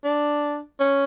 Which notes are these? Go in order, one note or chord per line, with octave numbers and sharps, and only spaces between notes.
D4
C#4